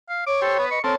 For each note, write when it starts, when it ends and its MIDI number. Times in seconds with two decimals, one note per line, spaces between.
0.09 0.22 77
0.26 0.65 73
0.26 0.38 86
0.42 0.58 67
0.42 0.58 69
0.42 0.58 72
0.59 0.67 59
0.59 0.79 71
0.71 0.80 75
0.71 0.82 85
0.84 0.95 60
0.84 0.95 69
0.84 0.93 70
0.84 0.95 73